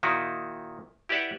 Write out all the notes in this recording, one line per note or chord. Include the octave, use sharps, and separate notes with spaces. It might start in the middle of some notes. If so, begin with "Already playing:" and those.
A#2 D#3 D#4 E4 F#4
E4 G4 B4 D5 E5 F#5